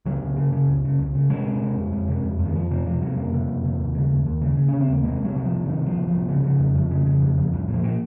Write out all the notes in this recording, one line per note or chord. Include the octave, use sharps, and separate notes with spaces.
C#2 F#3
C#2
C#3
C#3
C#2
C#3
C#2
C#3
C3 G#3
C3
C3
F2
F2
C3
F2
F2
D#3
F2 F3
C3 F3
C3 F3
C3 F#3
F2 A#3
C3
F2
C3
D#2
C#3
D#2
D#2
C#3
C#3
C#3 C#4
C4
D#2 A#3
C3 G#3
C2
F#3
C3
F3
C3
C2 D#3
C2 F3
C2
F3
C2
C#3
C#3
F2
F2
C#3
C#3
F2
F2
C2
A#2
F3
A#2